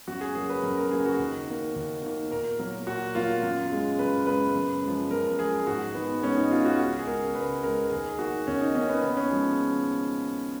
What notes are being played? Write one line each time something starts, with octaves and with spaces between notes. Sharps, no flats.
F#2 F#4
G#4
C#3 F#3 A#3 G#4
B4
F#2 A#4
A#4
C#3 F#3 A#3 G#4
F#4
D#2
D#3 A#3
D#2
D#3 A#3
A#2 A#4
F#3 A#3
A#2 F#4
F#3 A#3 F4
F#2
C#3 G#3
F#2 B4
C#3 G#3 B4
F#2
F3 G#3
F#2 A#4
F3 G#3 G#4
G#2 F#4
D#3 G#3 B3
G#2 C#4
D#4
D#3 G#3 F4
F#4
C#2 F#4
G#4
C#3 G#3 A#4
C#2 B4
C#3 G#3 A#4
D#2 G#4
D#3 A#3 F#4
D#2 C#4
D#4
D#3 A#3 C#4
B3
D#2 B3
C#4
C#3 F3 G#3